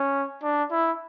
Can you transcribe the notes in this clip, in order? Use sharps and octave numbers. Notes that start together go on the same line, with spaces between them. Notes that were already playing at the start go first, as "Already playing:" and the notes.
Already playing: C#4
D4
E4